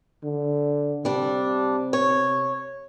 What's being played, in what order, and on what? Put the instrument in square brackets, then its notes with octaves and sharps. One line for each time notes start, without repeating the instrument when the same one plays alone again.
[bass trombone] D3
[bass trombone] C3 [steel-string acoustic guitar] G3 D4
[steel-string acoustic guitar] C#5